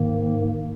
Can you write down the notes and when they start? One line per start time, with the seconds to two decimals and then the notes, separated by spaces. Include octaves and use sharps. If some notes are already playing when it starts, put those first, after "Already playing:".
Already playing: G#2 D#3 A#3